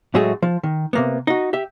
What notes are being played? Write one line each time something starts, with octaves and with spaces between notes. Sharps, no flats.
A2 F#3 G#3 A3 F#4 G#4
F3
D#3
C3 A#3 B3
D#4 F#4
G4 E5